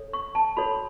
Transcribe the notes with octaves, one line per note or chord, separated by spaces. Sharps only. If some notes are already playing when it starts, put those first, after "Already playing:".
Already playing: A4 C#5
C#6
A5
F#4 A4 C#5 B5